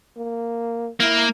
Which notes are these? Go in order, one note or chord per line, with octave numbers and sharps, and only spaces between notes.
A#3
A#3 E4